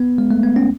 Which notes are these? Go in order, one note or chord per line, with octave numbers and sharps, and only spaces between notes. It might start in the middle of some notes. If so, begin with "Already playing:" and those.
Already playing: B3
G#3
A3
B3
C#4